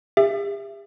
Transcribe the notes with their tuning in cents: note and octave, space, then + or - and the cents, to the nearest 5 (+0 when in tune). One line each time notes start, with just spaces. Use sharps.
G4 +45 E5 +20